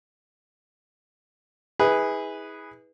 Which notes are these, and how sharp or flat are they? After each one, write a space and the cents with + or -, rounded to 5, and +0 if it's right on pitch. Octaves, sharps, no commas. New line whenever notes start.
E4 -40 G#4 -10 B4 +0